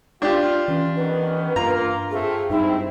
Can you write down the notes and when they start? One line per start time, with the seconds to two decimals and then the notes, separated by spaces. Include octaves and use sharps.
0.22 D4 F4 G4
0.68 E3 C#4
0.96 D#3 B3 C#4 B4
1.56 G2 A#3 F4 A#5
2.11 A3 C4 F4 G#4
2.50 G2 G#3 C4 D#4 E4